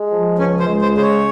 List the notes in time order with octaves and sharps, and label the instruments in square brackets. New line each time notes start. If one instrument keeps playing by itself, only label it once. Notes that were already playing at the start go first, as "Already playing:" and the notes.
Already playing: [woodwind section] G#3
F3
[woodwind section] C#2 [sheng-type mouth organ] C#4
[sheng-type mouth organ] C5
[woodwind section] G#3
[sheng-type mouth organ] C5
[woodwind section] C#3 [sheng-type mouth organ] C5
[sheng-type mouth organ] C#5